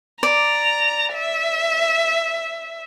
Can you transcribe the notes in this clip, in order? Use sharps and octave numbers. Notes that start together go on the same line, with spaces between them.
D5 A#5
E5